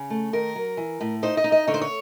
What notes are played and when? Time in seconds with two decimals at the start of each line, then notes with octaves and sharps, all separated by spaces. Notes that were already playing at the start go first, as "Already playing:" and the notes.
Already playing: C#3
0.10 A3
0.33 D#3 A#4
0.55 F#3
0.77 E3
1.01 A2
1.23 D#4 C5
1.37 D#5
1.44 D#4
1.52 D#5
1.67 D3 C#5
1.74 C5
1.81 C#5